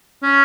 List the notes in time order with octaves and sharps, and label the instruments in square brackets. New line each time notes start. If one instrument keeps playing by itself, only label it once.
[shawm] C#4